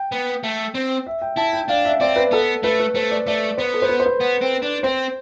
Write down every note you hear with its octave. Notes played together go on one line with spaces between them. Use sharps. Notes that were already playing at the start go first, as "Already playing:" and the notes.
Already playing: G5
B3
A3
C4
E5
G5
E4 A5
G5
D4 F5
E5
C4 D5
B4
B3 A4
A3 B4
B4
A3 C5
D5
A3 D5
B3 C5
A4
C5
B4
C5
B4
B3
C4
D4
C4 C5